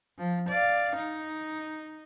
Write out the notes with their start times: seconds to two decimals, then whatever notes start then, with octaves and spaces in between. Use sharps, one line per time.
0.18 F3
0.49 D5 F5
0.96 D#4